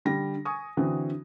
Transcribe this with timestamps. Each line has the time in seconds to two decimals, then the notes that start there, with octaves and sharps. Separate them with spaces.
0.05 D3 G3 A#6
0.45 G#5 C#6 D#6
0.77 D3 E3 C4 F#4